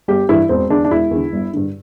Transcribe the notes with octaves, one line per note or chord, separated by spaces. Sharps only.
G1 G4
G2 E3 E4
E1 C4
E2 D3 D4
D4
E1 E4
E2 D3
G1
G2 D3